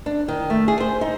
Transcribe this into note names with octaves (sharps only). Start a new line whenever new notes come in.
D4
D#3
A3
G#4
C5
D#4